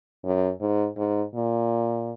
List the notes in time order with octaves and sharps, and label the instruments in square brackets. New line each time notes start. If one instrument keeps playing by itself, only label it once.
[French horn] F#2
G#2
G#2
A#2